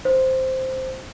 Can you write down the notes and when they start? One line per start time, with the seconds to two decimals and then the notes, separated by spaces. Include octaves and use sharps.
0.05 C5